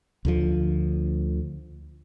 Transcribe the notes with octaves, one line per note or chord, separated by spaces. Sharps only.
D2 D3 F3